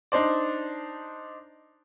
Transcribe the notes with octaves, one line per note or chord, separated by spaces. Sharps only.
D4 D#4 C5 D5